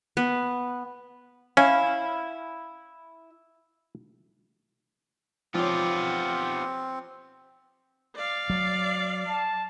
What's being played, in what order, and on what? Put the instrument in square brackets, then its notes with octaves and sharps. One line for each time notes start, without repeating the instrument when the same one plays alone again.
[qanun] B3
[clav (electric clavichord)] C#4 [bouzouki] E4 [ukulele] F5
[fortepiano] F3 C#5 [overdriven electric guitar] B3 D5 [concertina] C4 [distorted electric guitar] F4 G4
[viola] D5 F5
[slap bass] F#3
[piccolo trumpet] A5